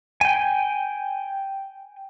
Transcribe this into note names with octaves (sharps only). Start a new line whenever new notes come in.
G5 G#5